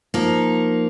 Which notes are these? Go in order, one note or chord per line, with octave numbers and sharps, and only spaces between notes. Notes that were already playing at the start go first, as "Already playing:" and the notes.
F3 A#3 D#4